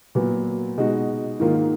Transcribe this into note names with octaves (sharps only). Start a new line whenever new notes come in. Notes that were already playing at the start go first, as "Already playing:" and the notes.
A#2 F#3 B3
B2 G#3 D#4 F#4
G#2 D#3 A#3 F4